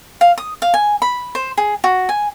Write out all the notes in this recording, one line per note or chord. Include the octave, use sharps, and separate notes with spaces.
F5
D#6
F5
G#5
B5
C5
G#4
F#4
G#5